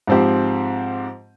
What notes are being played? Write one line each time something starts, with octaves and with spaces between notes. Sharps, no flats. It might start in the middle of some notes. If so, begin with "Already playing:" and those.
G#2 F3 C4 G4 C5